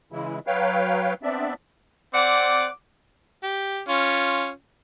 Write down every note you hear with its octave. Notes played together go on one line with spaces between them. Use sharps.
C#3 E3 G#3 E4
F#3 B4 C#5 F5 G5
B3 C4 D4 D5 E5
C4 D5 F#5 D6
G4
C#4 F4